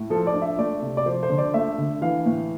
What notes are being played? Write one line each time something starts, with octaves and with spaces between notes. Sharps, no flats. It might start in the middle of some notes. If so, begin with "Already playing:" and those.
Already playing: A2
F3 A4
D5
D4
E5
A3 D5
C3
D5
F3 C5
C5
D3
D5
A3 E5
D3
E3 F5
A2